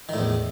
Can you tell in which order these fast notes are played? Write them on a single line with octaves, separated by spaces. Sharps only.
D#3 A2 E2